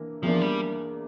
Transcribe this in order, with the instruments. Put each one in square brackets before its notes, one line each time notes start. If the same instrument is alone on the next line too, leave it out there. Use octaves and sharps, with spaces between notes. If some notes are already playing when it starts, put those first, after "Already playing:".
Already playing: [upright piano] E3 A#3 D4
[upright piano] E2 E3 A#3 D4 [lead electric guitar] F3
[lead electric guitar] G3